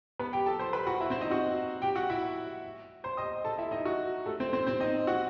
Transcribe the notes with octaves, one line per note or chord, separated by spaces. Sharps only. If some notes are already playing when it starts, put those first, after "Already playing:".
B3 B4
G4 G5
A4 A5
C5 C6
B4 B5
F#4 F#5
E4 E5
C4 C5
D#4 D#5
F#4 F#5
G4 G5
F#4 F#5
E4 E5
C5 C6
D#5 D#6
A4 A5
E4 E5
D#4 D#5
F#4
A3 A4
C4 C5
C4 C5
C4 C5
D#4 D#5
F#4 F#5